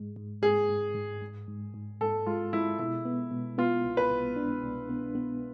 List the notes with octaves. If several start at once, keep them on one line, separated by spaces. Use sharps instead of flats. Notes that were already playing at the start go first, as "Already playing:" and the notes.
Already playing: G#2 G#3
G#2
G#2 G#4
G#2
G#2
G#2
G#2
G#2
G#2 A4
G#3 F4
G#3 E4
B2 E4
B3
B2
B3 F4
C2
B4
C2
D4
C2
B3
B3